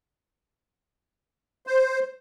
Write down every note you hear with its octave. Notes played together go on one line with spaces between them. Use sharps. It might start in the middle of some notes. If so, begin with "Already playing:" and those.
C5